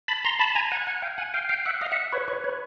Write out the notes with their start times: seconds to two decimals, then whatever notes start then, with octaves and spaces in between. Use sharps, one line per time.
0.08 A5 B5
0.24 A#5 C6
0.39 A5 B5
0.55 G#5 A#5
0.72 F#5 G#5
0.87 F#5 G#5
1.02 F5 G5
1.18 F#5 G#5
1.34 F5 G5
1.49 F5 G5
1.65 E5 F#5
1.81 D#5 F5
1.92 E5 F#5
2.12 B4 C#5
2.28 B4 C#5
2.44 B4 C#5